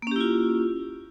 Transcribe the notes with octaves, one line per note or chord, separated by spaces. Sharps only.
A#3 C#4 E4 F4 G4